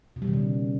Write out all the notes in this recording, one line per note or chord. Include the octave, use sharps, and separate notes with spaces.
B2
G3
D#3
C#3